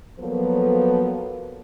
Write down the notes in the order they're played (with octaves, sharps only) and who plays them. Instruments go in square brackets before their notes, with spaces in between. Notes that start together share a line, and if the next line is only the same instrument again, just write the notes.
[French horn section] F3 F#3 A#3 B3 A4 B4